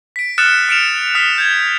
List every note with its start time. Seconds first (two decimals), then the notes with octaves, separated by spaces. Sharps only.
0.16 B6 D7
0.38 D#6 F6 F#6 A6 C#7 E7
0.69 F6 C#7 D7 E7 F7
1.15 D#6 F6 F#6 B6
1.38 G6 G#6